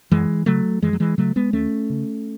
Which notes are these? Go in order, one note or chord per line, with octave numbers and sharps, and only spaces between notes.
F#2 E3 G#3
C#3 F#3 A3
F#2 E3 G#3
F#3
E3 G#3
C#3 F#3 A3
G#3 B3
D#2 A3 C#4
C#3